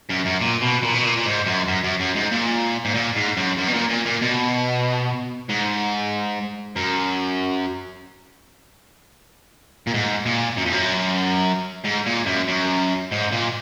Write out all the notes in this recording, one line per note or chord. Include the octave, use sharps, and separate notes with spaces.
F#2
F#2
A#2
B2
A#2
B2
A#2
A#2
G#2
F#2
F#2
F#2
F#2
G#2
A#2
G#2
A#2
G#2
F#2
F#2
B2
A#2
A#2
A#2
B2
G#2
F#2
A#2
G#2
A#2
F#2
F2
F#2
G#2
A#2
F#2
F#2
G#2
A#2